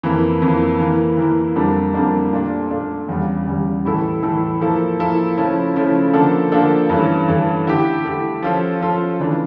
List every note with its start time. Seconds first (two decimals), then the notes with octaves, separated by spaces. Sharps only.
0.03 F2 E3 A#3 E4
0.42 F2 E3 A#3 E4
0.80 E3 A#3 E4
1.17 E3 A#3 E4
1.56 F2 D3 G3 A#3 D4
1.94 F2 D3 G3 A#3 D4
2.33 A#2 A3 D4
2.70 A#2 A3 D4
3.09 E2 C#3 G3
3.47 E2 C#3 G3
3.85 A2 E3 A3 E4 A4
4.23 A2 E3 A3 E4 A4
4.61 F3 A#3 E4 A4
4.99 F3 A#3 E4 A4
5.38 C#3 F3 A3 C#4 E4
5.76 C#3 F3 A3 C#4 E4
6.13 D3 F3 A#3 D4 A4
6.52 D3 F3 A#3 D4 A4
6.90 G2 E3 A3 C#4
7.28 G2 E3 A3 C#4
7.67 D3 A3 E4 G4
8.04 D3 A3 E4 G4
8.42 F3 C#4 F4 A4
8.81 F3 C#4 F4 A4
9.19 C#3 E3 A3 D4